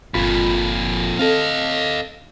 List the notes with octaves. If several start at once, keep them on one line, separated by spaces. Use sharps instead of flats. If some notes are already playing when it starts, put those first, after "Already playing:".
G1 F2 A#2 F4 B5
C4 A4 D#5 F5